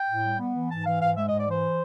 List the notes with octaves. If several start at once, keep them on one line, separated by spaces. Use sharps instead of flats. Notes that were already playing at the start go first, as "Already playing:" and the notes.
Already playing: G5
A2
G3
B3
E3
G#2 A5
E3 F5
G#2 F5
G#3 E5
G#2 D#5
D5
E3 C5